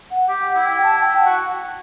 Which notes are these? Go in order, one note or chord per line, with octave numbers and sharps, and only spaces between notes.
F#5
G4
F#5
E4
G5
A5
G5
F#5
F#4